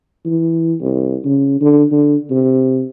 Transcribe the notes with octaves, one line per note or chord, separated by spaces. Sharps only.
E3
C2
C#3
D3
D3
C3